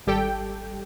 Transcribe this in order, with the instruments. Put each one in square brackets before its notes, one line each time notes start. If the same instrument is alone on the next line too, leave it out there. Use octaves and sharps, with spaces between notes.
[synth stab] G#1 G3 G4 A4 G5